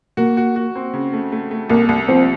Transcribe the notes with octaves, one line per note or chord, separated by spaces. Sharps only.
A#3 F#4
F#4
F#4
C4
C#3
A3
A3
A3
C2 A#3
C2
F3 C4